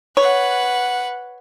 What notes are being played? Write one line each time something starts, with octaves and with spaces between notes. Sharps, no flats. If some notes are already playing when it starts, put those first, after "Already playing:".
B4 C#5 F#5